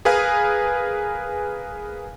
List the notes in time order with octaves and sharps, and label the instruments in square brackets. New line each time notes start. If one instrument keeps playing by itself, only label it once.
[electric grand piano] G#4 A#4 B4 F5 G#5